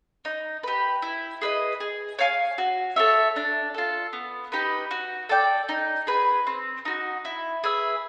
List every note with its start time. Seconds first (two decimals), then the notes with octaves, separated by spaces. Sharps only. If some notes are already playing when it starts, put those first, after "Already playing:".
0.25 D#4
0.63 G4 B4
1.02 E4
1.42 G#4 B4 D#5
1.80 G#4
2.19 C#5 F5 G#5
2.58 F#4
2.96 A4 C#5 E5
3.36 D4
3.74 F4 A4
4.13 B3
4.52 D#4 G4 B4
4.91 F#4
5.29 A4 D5 G5
5.69 D#4
6.07 G#4 B4
6.47 C4
6.85 D#4 F#4
7.25 E4
7.64 G#4 B4 E5